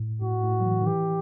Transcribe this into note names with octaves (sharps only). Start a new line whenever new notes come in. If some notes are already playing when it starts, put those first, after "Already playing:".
Already playing: A2
A2 F#4
A2
F#3
E3
D#3
E3 G4